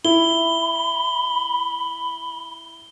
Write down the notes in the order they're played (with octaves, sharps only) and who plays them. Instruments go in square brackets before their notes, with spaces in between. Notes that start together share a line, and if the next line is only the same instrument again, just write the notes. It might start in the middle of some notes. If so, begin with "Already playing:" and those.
[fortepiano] E4 [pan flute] B5 [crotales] G7